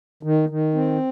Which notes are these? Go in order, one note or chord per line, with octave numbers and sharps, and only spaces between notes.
D#3
D#3
C4